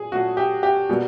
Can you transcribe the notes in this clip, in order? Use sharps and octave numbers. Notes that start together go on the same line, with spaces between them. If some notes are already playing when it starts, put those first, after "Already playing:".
Already playing: A#2 F#3 G#4
A#2 F#3 A3 F#4
G4
G4
B2 G3 A#3